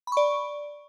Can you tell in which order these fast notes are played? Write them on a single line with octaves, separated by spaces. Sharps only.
B5 C#6 D5